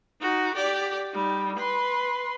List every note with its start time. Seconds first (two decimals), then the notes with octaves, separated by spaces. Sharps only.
0.21 D#4 F#4
0.54 G4 D5
1.14 G3 D#4
1.56 B4 C6